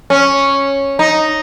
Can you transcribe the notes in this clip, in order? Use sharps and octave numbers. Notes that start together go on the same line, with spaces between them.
C#4
D#4